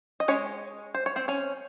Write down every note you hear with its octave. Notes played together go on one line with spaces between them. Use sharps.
D#5
G#3 C#4 C#5
C5
C#5
C4 C5
C#4 C#5